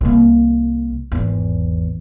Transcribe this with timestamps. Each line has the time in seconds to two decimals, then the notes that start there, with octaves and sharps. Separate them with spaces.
0.01 C2 A#3
1.12 G#1 E2